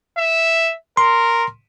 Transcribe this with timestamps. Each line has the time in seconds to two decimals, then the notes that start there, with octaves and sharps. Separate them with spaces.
0.18 E5
0.97 A#4 C6